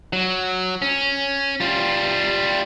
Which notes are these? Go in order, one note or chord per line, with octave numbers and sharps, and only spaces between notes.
F#3
C#4
G3 F4